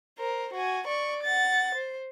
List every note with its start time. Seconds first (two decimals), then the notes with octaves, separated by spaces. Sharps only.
0.18 A#4 C5
0.54 F#4 G#5
0.87 D5 C#6
1.23 F#5 A6
1.75 C5